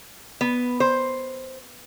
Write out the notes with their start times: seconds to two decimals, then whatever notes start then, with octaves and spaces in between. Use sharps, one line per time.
0.41 B3
0.80 C5